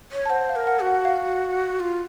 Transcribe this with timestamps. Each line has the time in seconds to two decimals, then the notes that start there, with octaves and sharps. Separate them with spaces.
0.12 C#5
0.26 A5
0.30 C5 F#5
0.49 F5
0.56 A#4
0.67 F#5
0.80 F#4
0.87 F#5
1.05 F5
1.80 F4